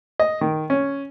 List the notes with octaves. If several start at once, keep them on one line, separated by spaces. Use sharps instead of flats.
D#5
D#3
C#4